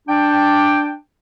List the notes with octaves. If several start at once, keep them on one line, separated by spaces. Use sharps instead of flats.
D4 G5